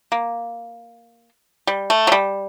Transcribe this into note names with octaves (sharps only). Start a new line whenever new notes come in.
A#3
G3
A3
F#3
G3